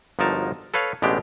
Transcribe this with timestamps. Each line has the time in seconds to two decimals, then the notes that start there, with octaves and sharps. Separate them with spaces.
0.19 G1 F3 F#3 D#4 A#4 A5
0.74 A4 B4 C#5 F5
1.02 A1 B2 G#3 D4 G4